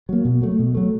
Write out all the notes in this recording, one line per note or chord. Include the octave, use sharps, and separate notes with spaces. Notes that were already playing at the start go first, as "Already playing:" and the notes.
F#3 A#3
B2
F#3 A3
B2
F#3 A3